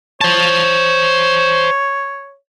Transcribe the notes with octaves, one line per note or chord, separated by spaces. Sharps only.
C5 C#5 A5